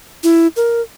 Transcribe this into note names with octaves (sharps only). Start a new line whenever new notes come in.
E4
A#4